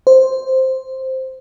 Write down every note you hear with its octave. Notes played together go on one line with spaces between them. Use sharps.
C5